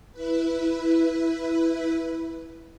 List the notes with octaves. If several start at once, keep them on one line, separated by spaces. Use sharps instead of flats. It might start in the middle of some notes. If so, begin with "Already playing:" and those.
E4 B4